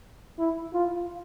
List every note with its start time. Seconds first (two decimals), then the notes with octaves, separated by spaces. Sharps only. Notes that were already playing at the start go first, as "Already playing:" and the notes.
0.38 E4
0.73 F4